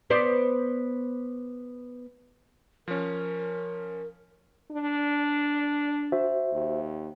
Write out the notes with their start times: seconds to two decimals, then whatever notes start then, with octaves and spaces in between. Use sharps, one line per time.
0.10 B3 C5 D5
2.88 F3 C#4 A#4
4.71 D4
6.12 F#4 C5 E5
6.52 D#2